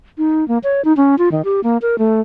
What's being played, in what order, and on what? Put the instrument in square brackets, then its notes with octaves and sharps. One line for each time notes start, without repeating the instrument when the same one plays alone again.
[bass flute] D#4
A#3
C#5
D#4
C#4
F4
D#3
G4
A#3
A#4
A3